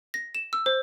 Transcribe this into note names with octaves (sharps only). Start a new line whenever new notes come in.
A#6
E7
E6
C5